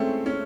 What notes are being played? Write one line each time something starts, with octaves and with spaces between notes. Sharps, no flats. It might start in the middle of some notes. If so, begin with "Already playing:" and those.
Already playing: G#3 A3 C4 C#4
C#4